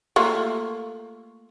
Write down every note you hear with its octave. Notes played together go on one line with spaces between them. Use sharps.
A3 A#3 F4